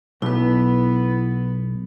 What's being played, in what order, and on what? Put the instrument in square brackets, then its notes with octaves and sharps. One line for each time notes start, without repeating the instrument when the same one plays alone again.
[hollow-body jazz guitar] B1 [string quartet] B3 [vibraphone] E4 B4